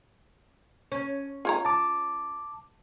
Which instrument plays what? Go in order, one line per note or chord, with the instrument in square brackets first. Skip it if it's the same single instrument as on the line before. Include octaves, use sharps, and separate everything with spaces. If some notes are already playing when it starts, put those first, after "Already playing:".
[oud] C#4
[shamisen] F4 C#5 A#5
[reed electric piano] A5 D6